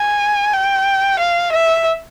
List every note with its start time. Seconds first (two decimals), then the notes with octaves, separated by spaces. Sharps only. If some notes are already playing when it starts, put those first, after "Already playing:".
Already playing: G#5
0.53 G5
1.19 F5
1.52 E5